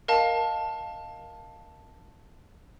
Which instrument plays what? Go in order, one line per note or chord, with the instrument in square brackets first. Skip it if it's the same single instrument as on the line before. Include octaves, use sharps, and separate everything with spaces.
[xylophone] A#4 D#5 F5 A5